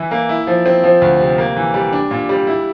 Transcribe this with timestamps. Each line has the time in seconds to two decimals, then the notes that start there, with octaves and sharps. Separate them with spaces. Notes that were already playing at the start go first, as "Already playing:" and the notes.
Already playing: E3 E4
0.11 A#3
0.29 E4
0.47 F3
0.66 C4
0.84 F3
1.02 D2
1.20 C3
1.38 A#3
1.57 E3
1.74 G3
1.93 D4
2.11 A#2
2.29 G3
2.47 E4